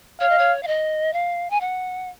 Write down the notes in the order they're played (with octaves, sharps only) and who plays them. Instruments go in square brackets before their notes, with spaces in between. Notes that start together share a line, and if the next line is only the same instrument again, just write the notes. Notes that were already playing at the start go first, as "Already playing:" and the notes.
[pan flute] C#5 [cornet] F5
[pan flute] D#5
C#5
F5
D#5
F5
G#5
F#5